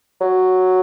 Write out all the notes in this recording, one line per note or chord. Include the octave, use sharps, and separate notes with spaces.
F#3